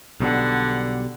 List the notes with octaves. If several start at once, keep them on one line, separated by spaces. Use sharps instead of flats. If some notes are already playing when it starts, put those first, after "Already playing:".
B1 B2 D3 G3 F#5